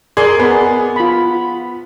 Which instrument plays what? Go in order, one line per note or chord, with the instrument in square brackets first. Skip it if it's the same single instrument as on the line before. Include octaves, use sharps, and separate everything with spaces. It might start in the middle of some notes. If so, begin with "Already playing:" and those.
[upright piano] G#4 [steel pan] A#4 D5 C6
[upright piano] B3 [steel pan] G#4 A#4 B4
[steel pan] F4 B5